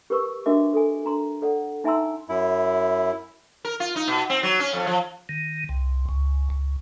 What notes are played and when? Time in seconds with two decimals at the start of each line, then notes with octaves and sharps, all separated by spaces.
0.10 G4 A#4 B4 C#6 E6
0.46 D4 F#4 A#4 D#5 E5 D6
0.74 A4 G#5
1.05 D4 A#5 C6
1.42 A4 D5 F#5
1.84 D#4 E5 G#5 A#5 C6 E6
2.29 F#2 E4
3.65 A#4
3.80 F4
3.96 D#4
4.08 B2
4.30 C4
4.43 F#3
4.60 C#4
4.73 F2
4.87 F3
5.29 D#3
5.69 C2
6.09 C#2
6.50 C#2